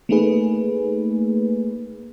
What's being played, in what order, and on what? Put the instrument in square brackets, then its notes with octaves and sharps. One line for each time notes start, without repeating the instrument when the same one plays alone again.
[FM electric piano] A3 A#3 D#4 G#4 B4